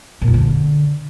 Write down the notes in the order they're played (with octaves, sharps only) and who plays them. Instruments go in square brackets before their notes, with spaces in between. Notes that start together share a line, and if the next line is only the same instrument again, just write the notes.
[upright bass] A#2
F2
D3